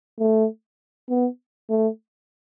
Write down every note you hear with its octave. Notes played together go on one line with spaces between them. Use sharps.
A3
B3
A3